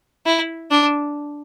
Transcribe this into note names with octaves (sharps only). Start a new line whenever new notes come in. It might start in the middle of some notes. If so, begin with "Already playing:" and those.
E4
D4